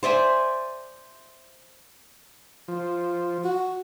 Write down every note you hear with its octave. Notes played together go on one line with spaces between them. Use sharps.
C5 D5 E5 G#5
F3
F#4